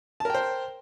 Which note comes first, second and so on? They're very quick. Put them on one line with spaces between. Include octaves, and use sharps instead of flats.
A5 A#4 G5 C5